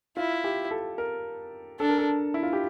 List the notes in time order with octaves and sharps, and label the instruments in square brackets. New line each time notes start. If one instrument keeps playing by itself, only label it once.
[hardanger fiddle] E4 [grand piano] F4
[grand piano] G4
A4
A#4
[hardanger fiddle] D4 [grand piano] A4
[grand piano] A#4
A4
E4
F4
G4